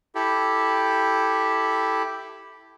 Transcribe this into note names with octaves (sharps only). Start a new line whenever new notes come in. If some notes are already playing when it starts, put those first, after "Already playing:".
E4 G4 A4